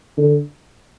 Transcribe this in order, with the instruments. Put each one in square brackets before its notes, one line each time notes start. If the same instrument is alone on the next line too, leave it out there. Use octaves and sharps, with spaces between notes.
[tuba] D3